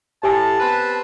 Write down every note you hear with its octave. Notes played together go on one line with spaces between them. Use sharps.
A2 G4 G#5 A5
B3 C4 B4